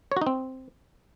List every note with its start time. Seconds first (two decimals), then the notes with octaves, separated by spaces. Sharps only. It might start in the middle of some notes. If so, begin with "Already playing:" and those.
0.12 C#5
0.17 F#4
0.22 D#4
0.27 C4